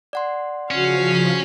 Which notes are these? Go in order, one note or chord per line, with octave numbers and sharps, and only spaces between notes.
D5 F#5 C6
C#3 F3 C#4 F#4 F5 B6